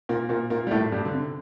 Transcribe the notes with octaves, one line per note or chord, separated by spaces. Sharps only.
A#2 A#3
A#2 A#3
A#2 A#3
G3
A2 A3
G2 G3
D3
C3